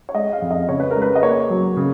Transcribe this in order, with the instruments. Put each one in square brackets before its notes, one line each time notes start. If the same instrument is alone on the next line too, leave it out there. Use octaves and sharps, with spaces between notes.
[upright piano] C#5
G#3 D#5
F5
F2
D#5
C#3 C#5
B4
G#3 A#4
B4
D#5
A#3 C#5
F#3
C#3